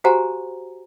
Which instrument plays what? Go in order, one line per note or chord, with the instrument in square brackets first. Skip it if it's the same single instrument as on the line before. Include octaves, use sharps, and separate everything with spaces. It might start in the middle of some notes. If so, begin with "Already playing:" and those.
[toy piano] F#4 G4 C5 F#5 G#5 A#5